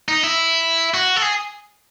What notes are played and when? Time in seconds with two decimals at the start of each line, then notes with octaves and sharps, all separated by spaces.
0.09 D#4
0.23 E4
0.94 F#4
1.16 A4
1.22 G#4